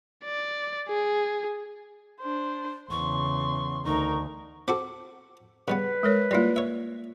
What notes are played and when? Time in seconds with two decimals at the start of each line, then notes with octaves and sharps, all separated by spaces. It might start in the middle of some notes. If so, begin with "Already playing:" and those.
0.24 D5
0.88 G#4
2.21 D4 C5
2.91 E2 C#3 C6 C#6
3.85 D2 D#4 A#4 C#6
4.68 C4 F#4 A4 D6
5.68 C#3 G3 B3 B4
6.03 G#3 A#4 C#5
6.31 G3 A#3 E4 F4 D5
6.56 C#5 E5